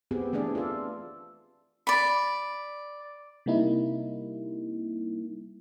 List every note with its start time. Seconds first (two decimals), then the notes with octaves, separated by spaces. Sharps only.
0.11 B3 C4 G4 G#4
0.33 E3 A3 D4 G#4 D5
0.55 F4 A4
1.87 D5 B5
3.46 C3 G3 A#3 D#4 E4